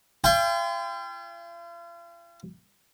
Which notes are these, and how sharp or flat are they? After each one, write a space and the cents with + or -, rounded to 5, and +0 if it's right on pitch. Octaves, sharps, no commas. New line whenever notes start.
F4 -40 G5 +20